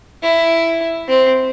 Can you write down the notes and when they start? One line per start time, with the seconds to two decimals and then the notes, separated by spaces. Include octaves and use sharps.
0.23 E4
1.09 C4